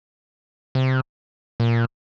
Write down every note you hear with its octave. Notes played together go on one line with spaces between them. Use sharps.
C3
A#2